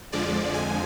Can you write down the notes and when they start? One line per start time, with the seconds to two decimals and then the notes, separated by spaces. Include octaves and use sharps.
0.12 F2 D3 F3 G#3 D5
0.54 G#5